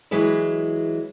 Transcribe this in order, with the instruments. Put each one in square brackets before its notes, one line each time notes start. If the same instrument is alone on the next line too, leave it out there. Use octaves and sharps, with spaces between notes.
[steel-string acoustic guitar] E3 F#3 G#3 B4